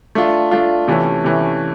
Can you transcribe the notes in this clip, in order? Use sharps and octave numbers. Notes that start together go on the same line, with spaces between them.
A3 D4 F4
A3 D4 F4
C3 E3 A3 C#4
C3 E3 A3 C#4